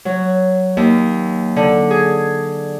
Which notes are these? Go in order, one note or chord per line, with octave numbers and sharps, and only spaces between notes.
F#3
D#2
D3
G#4